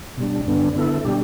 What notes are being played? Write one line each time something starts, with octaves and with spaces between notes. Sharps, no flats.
B2 G3 D4
G2 D3 B3 D4
D3 B3 E4 A4
B2 G3 D4 G4